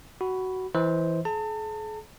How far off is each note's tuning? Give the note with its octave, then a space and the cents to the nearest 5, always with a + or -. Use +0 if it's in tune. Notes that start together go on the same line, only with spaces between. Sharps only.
F#4 +15 B5 +0
E3 +0 C5 +0 D#5 +45
G#4 +45 A5 +35